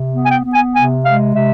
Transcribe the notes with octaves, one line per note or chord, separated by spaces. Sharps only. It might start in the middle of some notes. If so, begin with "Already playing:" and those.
Already playing: C3
B3
G#5
G5
B3
G#5
C3 G#5
G#3 F5
C3 E5